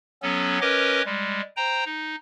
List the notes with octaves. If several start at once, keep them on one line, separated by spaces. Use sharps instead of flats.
F#3 B3 C#4 A4
C#4 A#4 B4 C#5 D#5 D6
G3 G#3
C5 G5 A#5
D#4